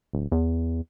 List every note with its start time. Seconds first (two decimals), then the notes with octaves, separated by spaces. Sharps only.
0.13 D1
0.32 E2